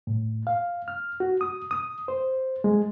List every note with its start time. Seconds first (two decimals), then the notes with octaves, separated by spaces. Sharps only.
0.07 A2
0.47 F5
0.88 F6
1.20 F#4
1.41 D#6
1.71 D#6
2.08 C5
2.64 G#3